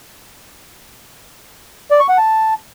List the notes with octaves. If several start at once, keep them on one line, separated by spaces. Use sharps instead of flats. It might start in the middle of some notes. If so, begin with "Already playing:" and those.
D5
C#6
F#5
A5